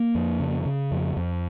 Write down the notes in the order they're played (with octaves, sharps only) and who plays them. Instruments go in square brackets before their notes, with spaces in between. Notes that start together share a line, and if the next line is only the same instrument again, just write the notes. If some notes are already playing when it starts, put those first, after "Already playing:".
Already playing: [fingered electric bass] A#3
F2
C#3
C#3
F2
F2